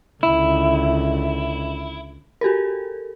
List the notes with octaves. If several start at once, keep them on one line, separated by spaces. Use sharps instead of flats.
C#2 D3 E4
F#4 G4 A4 A#4